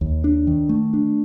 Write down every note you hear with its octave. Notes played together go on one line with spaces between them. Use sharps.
D#2
D4
D#3
A3
D4